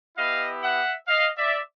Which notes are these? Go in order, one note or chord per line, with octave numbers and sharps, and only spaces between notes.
B3 E4 G4 D#5 F5
E5 F#5
D#5 F5
D5 E5